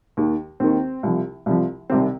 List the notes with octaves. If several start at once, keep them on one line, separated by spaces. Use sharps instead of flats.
D#2 D#3
D#2 D#3 C4
C2 C3 F3
C2 C3 F3
C2 C3 D#3 C4